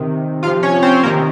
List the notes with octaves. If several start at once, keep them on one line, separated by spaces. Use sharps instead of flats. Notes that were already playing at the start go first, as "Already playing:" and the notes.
Already playing: C3 D#3
C3 F3 F4 F5
C#4 C#5
C4 C5
C3 D#3 A#3 A#4